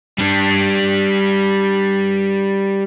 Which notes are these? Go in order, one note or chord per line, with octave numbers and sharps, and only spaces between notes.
G3 D4